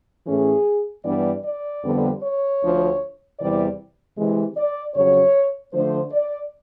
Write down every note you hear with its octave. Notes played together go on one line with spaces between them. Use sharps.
A2 E3 A3 C#4 G#4
G2 E3 G3 B3 D4 D5
D5
F2 D3 G3 B3
C#5
D2 D3 F3
E2 C3 E3 G3 D5
C3 E3 G#3
D5
F2 C#3 F#3 C#5
D3 F3 A3 D4 C5
D5